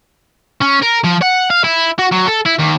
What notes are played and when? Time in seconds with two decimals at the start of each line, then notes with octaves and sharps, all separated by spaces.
0.62 C#4
0.83 A#4
1.04 F3
1.22 F#5
1.50 F5
1.64 E4
1.99 F#4
2.12 F#3
2.27 A4
2.46 E4
2.59 D#2